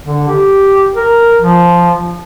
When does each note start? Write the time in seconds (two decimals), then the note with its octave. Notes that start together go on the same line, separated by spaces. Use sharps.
0.05 D3
0.28 G4
0.96 A#4
1.39 F3